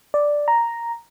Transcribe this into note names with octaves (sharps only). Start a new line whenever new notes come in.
D5
A#5